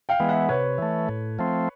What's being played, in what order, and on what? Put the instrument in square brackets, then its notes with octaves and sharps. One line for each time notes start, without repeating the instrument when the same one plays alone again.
[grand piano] F5 G5
[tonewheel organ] E3 G#3 B3
[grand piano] E5 F#5
[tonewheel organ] C3 [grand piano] B4 C#5
[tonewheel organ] E3 A3
A2
F3 A3 C4